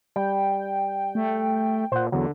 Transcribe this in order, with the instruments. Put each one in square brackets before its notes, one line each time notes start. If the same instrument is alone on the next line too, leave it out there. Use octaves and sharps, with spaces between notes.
[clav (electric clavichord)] G3 [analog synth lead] G5
[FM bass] A3
[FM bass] A#2 [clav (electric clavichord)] C5 F#5
[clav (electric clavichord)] E2 F#3 [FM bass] D3